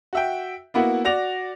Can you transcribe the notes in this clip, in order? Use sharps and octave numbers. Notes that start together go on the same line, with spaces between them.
F#4 E5 G5
A#3 B3 E4 F#4
F#4 D5 A#6 F7